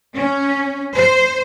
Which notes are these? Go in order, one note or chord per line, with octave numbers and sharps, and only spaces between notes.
C#4
C5